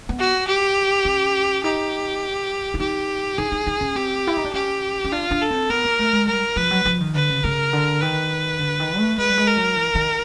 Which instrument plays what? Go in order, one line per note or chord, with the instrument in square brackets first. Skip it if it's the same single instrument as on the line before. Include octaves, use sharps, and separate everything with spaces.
[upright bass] B3
[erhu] F#4
G4
[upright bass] C#4
[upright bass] D#4 [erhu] G4
[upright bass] E4
[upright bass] D#4 [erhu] G4
[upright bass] D#4 [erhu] G#4
[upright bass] D#4
D#4
C#4
[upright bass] C4 [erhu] G4
[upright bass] E4
D#4
D4
[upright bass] C#4 [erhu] G4
[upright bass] C#4
[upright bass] D4 [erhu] F4
[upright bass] D4
[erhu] A4
[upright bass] C4
[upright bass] B3 [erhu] A#4
[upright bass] A#3
A3
G#3
[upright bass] G3 [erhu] A#4
[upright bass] F3 [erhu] B4
[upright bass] F#3
F3
D#3
[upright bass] D3 [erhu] B4
[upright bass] C#3
[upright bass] C#3 [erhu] A#4
[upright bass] D3
[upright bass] D#3 [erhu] B4
[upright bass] D3
D#3
A3
[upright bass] G#3 [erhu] B4
[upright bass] G3
G#3
[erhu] A#4
[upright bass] F#3
E3
D#3